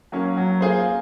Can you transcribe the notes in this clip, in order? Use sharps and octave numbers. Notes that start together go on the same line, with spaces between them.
F#3 A#3 C#4
F#3
A#3 F4 G#4 C5